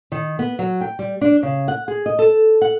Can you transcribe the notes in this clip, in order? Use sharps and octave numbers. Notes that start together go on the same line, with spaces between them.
D#3
B3
F#3
G5
G3
D4
C#3
F#5
G#4
D#5
A4
F#5